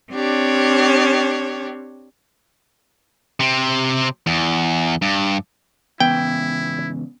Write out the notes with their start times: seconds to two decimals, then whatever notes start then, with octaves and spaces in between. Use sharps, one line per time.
0.12 C4 D4 G4 C#5
3.40 C3 C4
4.27 E2
5.02 G2
6.00 G#2 C#3 E3 B3 E4 G5